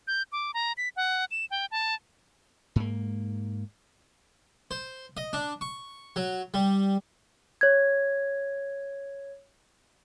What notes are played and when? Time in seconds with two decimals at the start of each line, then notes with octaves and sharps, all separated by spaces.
0.07 G6
0.32 D6
0.54 A#5
0.77 B6
0.96 F#5
1.31 E7
1.51 G5
1.71 A5
2.76 G#2 A#3
4.71 C5
5.17 D#5
5.33 D4
5.61 C#6
6.16 F#3
6.54 G3
7.61 C#5 G#6